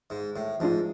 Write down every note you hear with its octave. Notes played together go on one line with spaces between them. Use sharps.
G#2
A2
G#2 F3 A3 D4 F4